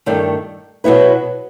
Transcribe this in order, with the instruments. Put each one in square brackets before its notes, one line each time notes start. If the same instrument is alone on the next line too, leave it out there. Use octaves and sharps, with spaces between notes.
[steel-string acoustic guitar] G2 D#3 A3
B2 F#3 B3 E4 B4